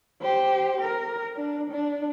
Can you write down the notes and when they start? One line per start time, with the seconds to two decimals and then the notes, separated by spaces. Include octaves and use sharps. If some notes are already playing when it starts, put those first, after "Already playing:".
0.22 G4 C5
0.81 A#4
1.36 D4
1.71 D4